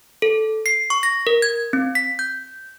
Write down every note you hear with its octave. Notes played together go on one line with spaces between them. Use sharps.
A4
C7
C#6
A#6
A#4
G#6
C4
B6
G6